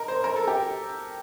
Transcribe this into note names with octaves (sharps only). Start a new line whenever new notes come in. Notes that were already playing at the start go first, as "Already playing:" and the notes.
Already playing: D#4 A#4
C5
A#4
A4
G4